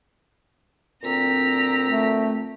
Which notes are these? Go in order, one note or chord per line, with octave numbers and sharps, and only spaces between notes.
D2 A#2 C4 A#5 B6
A3